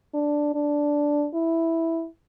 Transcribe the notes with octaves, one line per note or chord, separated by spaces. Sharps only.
D4
D4
E4